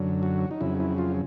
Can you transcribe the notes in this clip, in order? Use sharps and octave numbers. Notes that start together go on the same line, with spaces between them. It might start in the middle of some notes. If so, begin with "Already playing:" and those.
Already playing: F#2 D3 F#3
F#4
D#4
F2 C#3 F#3 E4
E4
F4